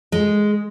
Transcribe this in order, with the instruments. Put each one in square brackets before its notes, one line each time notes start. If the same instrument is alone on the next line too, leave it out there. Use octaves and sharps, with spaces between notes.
[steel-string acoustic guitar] G#3